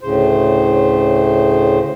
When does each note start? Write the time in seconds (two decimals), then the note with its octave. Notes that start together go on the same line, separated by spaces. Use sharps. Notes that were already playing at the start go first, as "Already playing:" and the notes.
0.01 D2 A2 C#3 C5